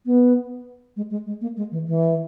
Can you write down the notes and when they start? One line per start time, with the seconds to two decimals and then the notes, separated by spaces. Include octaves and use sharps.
0.06 B3
0.97 G#3
1.11 G#3
1.27 G#3
1.41 A#3
1.57 G#3
1.72 E3
1.87 E3